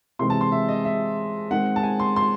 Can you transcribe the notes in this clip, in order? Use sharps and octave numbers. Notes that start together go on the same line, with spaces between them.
C3 E3 G#3 C4 C6
A5
C6
E5
D#5
E5
D#3 G#3 C4 F#5
A5
G#5
C6
C6